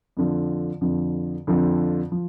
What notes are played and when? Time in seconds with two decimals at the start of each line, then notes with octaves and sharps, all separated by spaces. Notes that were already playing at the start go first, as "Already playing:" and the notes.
0.17 F2 D3 F3
0.81 F2 D3 F3
1.47 F2 D3 F3
2.12 F3